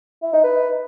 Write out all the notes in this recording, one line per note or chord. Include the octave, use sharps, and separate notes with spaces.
E4
D#4
B4